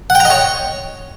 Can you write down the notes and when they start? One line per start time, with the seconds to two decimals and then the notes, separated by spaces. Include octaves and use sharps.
0.10 F#5
0.15 G5
0.20 A#5
0.25 D#5
0.30 C#5